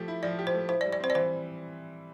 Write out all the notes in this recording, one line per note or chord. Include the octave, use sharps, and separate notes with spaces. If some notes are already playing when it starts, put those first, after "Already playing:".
Already playing: F3 A3 G4
E4
F3 D5
G4
C5
A3
E4 C5
D5
G3
D5
C4 C5
D5
E3 C5